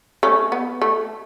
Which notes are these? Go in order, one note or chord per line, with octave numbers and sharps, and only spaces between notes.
A3 C#4
B3
A3